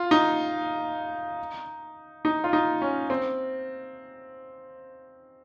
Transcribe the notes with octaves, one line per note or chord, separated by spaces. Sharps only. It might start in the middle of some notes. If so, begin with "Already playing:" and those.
Already playing: F4
D#4
D#4
F4
D#4
C#4
C4